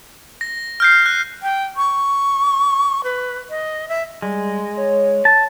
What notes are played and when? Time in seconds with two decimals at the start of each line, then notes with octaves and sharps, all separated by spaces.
0.41 A#6
0.80 F6 G6 C7
1.06 F#6
1.43 G5
1.76 C#6
3.04 B4
3.50 D#5
3.88 E5
4.22 G3 G#3
4.77 C#5
5.25 A5